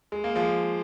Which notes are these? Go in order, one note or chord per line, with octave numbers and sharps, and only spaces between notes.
G#3
A#3
F3 G#3